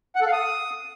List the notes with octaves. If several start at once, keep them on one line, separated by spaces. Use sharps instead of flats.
F#5
A4
F5
D#6